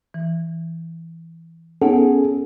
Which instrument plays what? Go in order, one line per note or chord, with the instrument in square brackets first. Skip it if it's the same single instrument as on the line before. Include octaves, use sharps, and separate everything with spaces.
[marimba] E3
[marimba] B3 D#4 F#5 [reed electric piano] C#4 G#4 A4